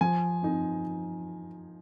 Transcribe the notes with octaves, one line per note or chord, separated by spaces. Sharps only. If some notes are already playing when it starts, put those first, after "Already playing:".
F3 G#5
C4 D#4